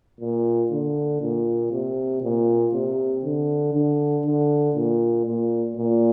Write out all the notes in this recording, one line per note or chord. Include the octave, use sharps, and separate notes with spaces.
A#2
D3
A#2
C3
A#2
C3
D3
D3
D3
A#2
A#2
A#2